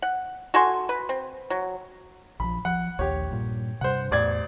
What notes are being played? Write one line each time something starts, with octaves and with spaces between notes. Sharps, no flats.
F#5
F#4 A4 G#5 C6
B4
C4
F#3
A#1 F3 B5
F3 F#5
A#1 D#2 G4 C#5
G2 A#2
G2 C3 C5 F#5
A1 E2 A2 D5 G#6